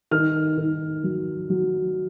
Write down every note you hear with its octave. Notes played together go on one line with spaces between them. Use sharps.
D#3 F6
D#3
F#3
F#3